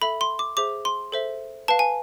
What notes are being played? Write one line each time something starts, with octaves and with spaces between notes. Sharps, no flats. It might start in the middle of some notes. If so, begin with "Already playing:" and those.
A4 E5 B5
C6
D6
G#4 C5 E5 D6
C6
A4 C5 E5
B4 F5 A5
G#5